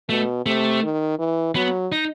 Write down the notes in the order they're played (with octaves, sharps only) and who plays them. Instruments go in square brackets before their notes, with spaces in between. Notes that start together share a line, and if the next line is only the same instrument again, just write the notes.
[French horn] B2 [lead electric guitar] A3
[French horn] C3 [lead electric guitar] A3
[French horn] D#3
E3
[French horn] F#3 [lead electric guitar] B3
[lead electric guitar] D#4